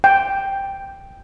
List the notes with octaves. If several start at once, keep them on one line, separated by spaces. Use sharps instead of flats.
G5